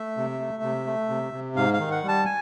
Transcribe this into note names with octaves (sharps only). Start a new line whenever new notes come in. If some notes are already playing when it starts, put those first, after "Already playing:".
Already playing: A3 E5
C3
A3
C3
A3
C3
C3
G#2 F5
F5
D#3
F#5
G3
A5
G#5